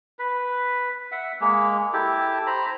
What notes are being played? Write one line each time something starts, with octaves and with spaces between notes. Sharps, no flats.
B4
E5 F#5
G#3 A#3
E4 G4 A4
C5 A#5 B5